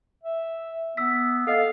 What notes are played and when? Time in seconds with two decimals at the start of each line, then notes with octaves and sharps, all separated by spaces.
0.23 E5
0.97 B3 E6 B6
1.47 A4 D#5 F5